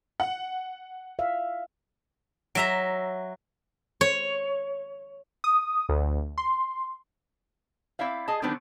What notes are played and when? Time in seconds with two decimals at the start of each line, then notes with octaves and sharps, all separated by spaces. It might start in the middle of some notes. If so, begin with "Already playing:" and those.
0.20 F#5
1.19 E5 F5
2.55 F#3 E5 A#5
4.01 C#5
5.44 D#6
5.89 D2
6.38 C6
7.99 C4 E4 D5 E5 F5
8.28 G#4 D#5 A5
8.42 D3 D#3 F#3 B3 C4 D4